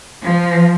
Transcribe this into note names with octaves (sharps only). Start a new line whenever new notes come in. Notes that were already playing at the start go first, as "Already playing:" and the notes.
F3